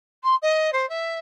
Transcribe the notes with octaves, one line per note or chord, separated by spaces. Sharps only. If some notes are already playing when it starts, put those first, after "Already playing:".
C6
D#5
C5
E5